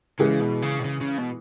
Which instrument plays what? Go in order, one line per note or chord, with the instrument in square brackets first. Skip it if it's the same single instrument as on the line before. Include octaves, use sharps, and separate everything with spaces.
[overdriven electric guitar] C#3 [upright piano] E3 G#3
[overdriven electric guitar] B2
C#3
B2
C#3
C#3
B2